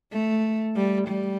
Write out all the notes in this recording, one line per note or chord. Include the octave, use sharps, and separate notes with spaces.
A3
G3
G3